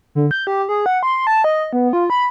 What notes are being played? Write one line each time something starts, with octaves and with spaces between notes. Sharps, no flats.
D3
G6
G4
G#4
F#5
C6
A5
D#5
B3
F4
B5